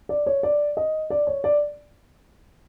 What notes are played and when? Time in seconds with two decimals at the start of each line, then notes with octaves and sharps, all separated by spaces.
0.09 D5
0.26 C#5
0.43 D5
0.77 D#5
1.10 D5
1.27 C#5
1.44 D5